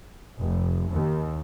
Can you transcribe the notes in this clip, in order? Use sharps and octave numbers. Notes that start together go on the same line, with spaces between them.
F1
D#2